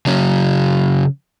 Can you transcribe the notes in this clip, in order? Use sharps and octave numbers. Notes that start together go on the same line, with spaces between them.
C#3 F#3 C#4